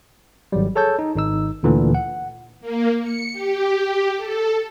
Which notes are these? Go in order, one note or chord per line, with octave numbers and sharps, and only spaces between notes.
G#1 F#3 G3
G#4 A4 C#5 A5 E6 G6
D#4
G#1 D#4 E6
D2 A#2 D3 E3
F#5
A#3
C#7
G4
A4